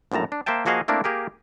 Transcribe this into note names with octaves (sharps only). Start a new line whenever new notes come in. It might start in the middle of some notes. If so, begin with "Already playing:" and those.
A#1 F#2 A2 A5 A#5
D4
A#3 C5 E5 G5 A5
F3 A#3 F#4 G#4 D#5 F5
A3 A#3 C4 D4 E4 A#4
A#3 G4 G#4 A#4